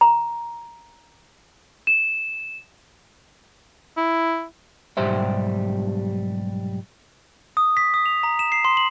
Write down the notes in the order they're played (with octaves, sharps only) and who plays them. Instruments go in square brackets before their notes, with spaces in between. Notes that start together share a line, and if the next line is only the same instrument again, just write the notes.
[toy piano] A#5
[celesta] E7
[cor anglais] E4
[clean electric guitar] B1 G#2 G3 G4 C5 E5
[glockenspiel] D#6
B6
D#6
F7
A#5
E7
C7
C6
F#7